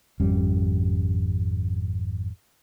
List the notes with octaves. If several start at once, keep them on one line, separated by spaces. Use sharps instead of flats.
G#1 F2 G3 C#4